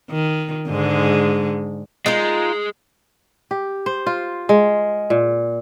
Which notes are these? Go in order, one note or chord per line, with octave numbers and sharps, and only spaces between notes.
D#3
G#2 D3 G#3
G#3 D#4 F4 A#4
G4
C5
F4
G#3
A#2